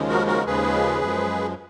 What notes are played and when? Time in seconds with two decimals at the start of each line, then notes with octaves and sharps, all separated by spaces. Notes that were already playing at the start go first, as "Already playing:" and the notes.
Already playing: D#2 C#3 F3 G#3
0.09 F#4 A#4
0.27 F#4 A#4
0.46 D#2 C#3 F3 G#3 G#4 B4
1.01 F#2 F3 G#3